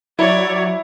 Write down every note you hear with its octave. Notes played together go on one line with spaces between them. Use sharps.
F#3 E4 C#5 D5